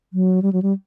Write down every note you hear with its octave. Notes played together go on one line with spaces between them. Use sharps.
F#3
G3
F#3
G3